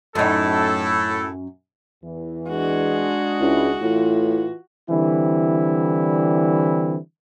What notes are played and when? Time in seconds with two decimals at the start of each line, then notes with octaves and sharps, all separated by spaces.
0.15 F#2 A2 D#4 A4
2.04 E2 E3
2.49 G#3 D4 F#4 G#4
3.40 C#2 E4
3.82 A2 E3 F4
4.90 D3 E3 G3 C4 E4